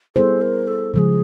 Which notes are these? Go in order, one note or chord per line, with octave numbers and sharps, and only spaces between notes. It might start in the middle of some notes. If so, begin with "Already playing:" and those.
G3 B3 E4 G#4 A4 C5
A#4
A4
C#3 F3 G#3 G#4 A4